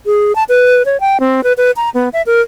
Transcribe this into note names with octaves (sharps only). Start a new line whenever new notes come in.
G#4
A5
B4
C#5
G5
C4
B4
B4
A#5
B3
E5
A#4